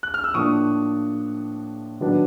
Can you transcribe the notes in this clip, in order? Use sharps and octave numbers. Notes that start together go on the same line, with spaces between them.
F#6
F6
E6
A2 F3 A#3 D4 C#6 D#6
D#3 F#3 B3 D4